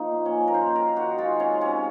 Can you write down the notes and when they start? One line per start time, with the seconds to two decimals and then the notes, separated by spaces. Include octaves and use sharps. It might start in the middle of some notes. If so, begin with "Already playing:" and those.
Already playing: F3 A#3 D#4
0.12 A#2
0.26 C#4
0.33 A#3
0.48 A#4
0.54 D#3 C5
0.75 D#3 A#4
0.96 D#3 F#4
1.18 G#3 F4
1.40 C3 C#4
1.61 C3 C#4